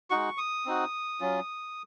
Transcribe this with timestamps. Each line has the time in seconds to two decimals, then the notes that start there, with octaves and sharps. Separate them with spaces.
0.10 G#3 D#4 F#4 C#6
0.38 D#6
0.66 C4 D#4 F#4
1.21 F#3 C#4 F4